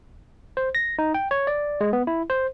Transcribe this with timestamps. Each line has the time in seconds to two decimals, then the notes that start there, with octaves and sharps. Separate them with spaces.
0.57 C5
0.75 A#6
0.99 D#4
1.14 G5
1.31 C#5
1.47 D5
1.81 G#3
1.93 B3
2.07 E4
2.30 C5